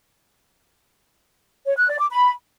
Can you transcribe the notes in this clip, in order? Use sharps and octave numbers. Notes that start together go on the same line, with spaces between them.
C#5
F#6
D5
D6
B5